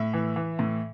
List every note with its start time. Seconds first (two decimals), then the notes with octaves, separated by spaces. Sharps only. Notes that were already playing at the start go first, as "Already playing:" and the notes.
Already playing: A2 E5
0.14 E3
0.36 E3
0.59 A2